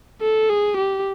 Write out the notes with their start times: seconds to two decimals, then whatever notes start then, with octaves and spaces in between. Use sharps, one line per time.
0.21 A4
0.50 G#4
0.77 G4